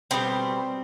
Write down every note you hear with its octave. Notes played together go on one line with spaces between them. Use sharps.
B2 G3 C4 C5